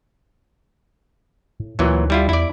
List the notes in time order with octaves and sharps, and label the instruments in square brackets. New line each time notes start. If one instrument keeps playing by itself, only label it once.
[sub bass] A2
[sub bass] D2 [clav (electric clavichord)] A#2 E3 F#3
[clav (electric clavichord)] G3 E4 F4
[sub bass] E2 [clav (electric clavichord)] E4 D5